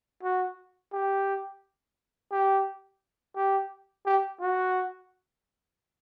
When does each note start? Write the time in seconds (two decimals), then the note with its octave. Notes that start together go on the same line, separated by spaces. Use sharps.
0.23 F#4
0.93 G4
2.32 G4
3.36 G4
4.06 G4
4.41 F#4